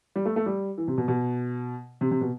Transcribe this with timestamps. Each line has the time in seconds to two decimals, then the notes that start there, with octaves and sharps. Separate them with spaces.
0.16 G3
0.25 A3
0.36 A3
0.46 G3
0.78 E3
0.88 C3
0.98 B2
1.08 B2
2.01 C3
2.11 C3
2.21 B2